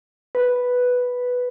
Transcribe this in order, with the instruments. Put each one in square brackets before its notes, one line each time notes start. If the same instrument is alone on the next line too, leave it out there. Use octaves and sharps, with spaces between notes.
[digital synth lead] B4